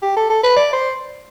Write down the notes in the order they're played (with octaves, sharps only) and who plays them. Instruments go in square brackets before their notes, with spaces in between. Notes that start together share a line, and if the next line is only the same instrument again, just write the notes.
[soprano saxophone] G4
A4
A4
B4
D5
C5